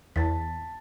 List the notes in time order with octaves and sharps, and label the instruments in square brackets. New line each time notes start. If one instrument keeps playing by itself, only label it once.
[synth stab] E2 [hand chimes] A5 A6 B6